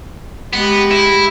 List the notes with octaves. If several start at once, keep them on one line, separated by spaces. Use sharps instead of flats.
G#3 B3 G4
E4